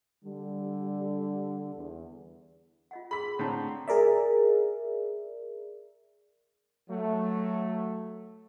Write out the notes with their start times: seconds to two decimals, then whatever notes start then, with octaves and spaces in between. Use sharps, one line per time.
0.24 D3 G3
1.75 E2
2.91 F4 D#5 F#5
3.11 G#4 B5 C6 E6 B6
3.39 A2 D3 C4 C#5 A5 A#5
3.88 G#4 A#4 D5 E5
6.90 F#3 A3